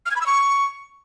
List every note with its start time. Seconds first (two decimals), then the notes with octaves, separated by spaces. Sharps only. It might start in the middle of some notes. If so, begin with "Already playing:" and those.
0.06 F6
0.11 G#6
0.16 B5
0.21 E6
0.26 C#6